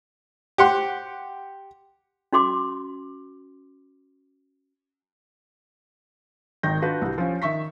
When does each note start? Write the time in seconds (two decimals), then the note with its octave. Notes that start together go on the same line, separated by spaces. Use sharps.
0.58 G4 F#5 C6
2.33 C#4 F#4 C6 D6
6.63 G#1 D#3 G5 G6 A#6
6.82 D4 F4 F#4 B4
7.02 C2 G3
7.18 F3 C#4
7.42 D#3 E5 C#6 B6